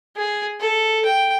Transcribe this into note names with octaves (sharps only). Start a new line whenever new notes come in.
G#4
A4
G5